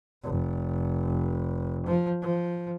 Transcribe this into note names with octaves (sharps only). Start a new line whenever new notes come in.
F1
F3
F3